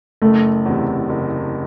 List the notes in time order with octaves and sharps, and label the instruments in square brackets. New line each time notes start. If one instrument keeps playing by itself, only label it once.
[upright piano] F#1 [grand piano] A3
[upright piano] E2 C3
F#1